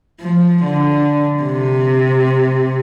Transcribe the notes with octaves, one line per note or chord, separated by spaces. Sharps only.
F3
D3
C3